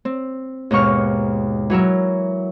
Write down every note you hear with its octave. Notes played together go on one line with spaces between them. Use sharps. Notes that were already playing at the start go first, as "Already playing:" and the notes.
C4
D#2 G#2 B2 C#6 F6
E3 F#3 A#4 E5